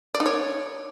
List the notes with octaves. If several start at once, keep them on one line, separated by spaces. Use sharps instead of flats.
D5
D#4
C#5